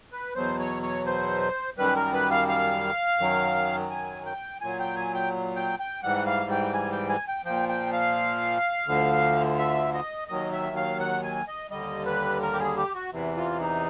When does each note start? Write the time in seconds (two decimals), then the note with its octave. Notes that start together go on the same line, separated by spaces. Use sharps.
0.12 B4
0.35 E2 B2 F#3 C5
0.59 C#5
0.83 C#5
1.06 C5
1.78 F#2 D#3 G3 B4
1.96 A#4
2.13 B4
2.31 F5
2.48 F5
3.19 F#2 D#3 F#3
3.91 G#5
4.26 G5
4.61 A#2 F#3 G#5
4.80 G5
4.96 G#5
5.14 G5
5.56 G5
5.79 G5
6.03 G#2 E3 G3 F#5
6.26 F5
6.51 G5
6.74 G#5
6.92 G5
7.09 G#5
7.28 G5
7.45 A#2 F3 G5
7.69 G5
7.93 F5
8.88 D2 D3 F3
9.58 E5
9.94 D#5
10.28 D#2 D#3 F#3 D#5
10.53 E5
10.76 F5
11.00 F#5
11.24 G#5
11.48 D#5
11.70 D#2 D3 G3 D#5
12.06 B4
12.42 A#4
12.53 G4
12.60 G#4
12.77 G4
12.94 F#4
13.12 E2 C3 E3
13.37 F4
13.60 D#4